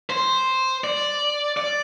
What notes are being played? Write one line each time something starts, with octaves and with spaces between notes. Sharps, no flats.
C5
D5
D5